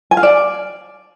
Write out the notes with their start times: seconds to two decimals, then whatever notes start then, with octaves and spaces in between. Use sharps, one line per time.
0.11 G#5
0.17 F5
0.23 D5